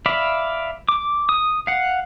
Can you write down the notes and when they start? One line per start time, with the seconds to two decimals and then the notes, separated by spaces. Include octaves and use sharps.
0.06 D5 E5 F5 B5
0.89 D6
1.29 D#6
1.67 F5 F#5